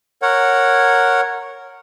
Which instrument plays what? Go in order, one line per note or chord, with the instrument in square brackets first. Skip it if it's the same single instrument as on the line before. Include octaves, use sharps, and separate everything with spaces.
[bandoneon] A#4 C#5 F#5